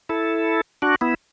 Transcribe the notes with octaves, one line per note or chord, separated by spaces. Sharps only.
E4 A4
D4 F#4
B3 E4